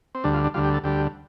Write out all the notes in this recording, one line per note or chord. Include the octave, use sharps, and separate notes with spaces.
C4
D2 D3 G3 D4
F4
D4
D2 D3 G3 F4
G4
A4
D2 D3 G3 G4